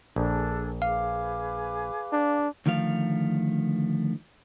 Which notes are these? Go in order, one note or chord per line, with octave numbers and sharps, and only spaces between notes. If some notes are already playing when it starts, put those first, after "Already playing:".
A#1 D4 G#4 A4
G#4 B4 F5 D6
D4
D2 D#3 F3 A3 F5